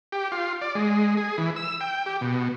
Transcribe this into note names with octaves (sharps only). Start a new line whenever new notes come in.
G4
F4
D5
G#3
G#4
E3
E6
G5
G4
B2